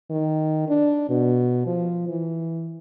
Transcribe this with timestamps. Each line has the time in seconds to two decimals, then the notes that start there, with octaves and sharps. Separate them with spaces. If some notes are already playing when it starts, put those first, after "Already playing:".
0.10 D#3
0.68 D4
1.09 B2
1.66 F3
2.08 E3